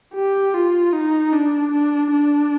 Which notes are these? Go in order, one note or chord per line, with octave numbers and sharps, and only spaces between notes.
G4
F4
D#4
D4
D4
D4